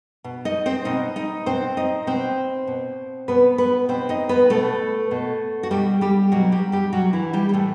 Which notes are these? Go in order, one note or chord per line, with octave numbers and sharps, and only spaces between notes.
B2
D#4 D#5
C4 C5
B2 D#4 D#5
D#4 D#5
B2 C4 C5
D#4 D#5
B2 C4 C5
B2
B2 B3 B4
B3 B4
B2 C4 C5
D#4 D#5
B3 B4
B2 A3 A4
B2
F#4
B2 G3 G4
G3 G4
B2 F#3 F#4
G3 G4
G3 G4
B2 F#3 F#4
E3 E4
G3 G4
G4
A2 E3 A3 A4